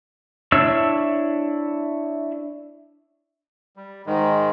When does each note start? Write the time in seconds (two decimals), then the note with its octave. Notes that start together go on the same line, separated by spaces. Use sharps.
0.52 D4 E4 C#5 E6
3.76 G3
4.06 G#2 D#3 G#3